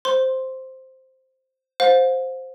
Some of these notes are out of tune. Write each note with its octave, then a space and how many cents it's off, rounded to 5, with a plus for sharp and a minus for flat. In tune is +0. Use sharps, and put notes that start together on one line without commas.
C5 +0 C6 +5
C5 +0 F5 +40